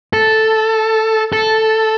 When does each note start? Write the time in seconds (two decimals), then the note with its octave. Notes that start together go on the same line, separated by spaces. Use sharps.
0.13 A4
1.33 A4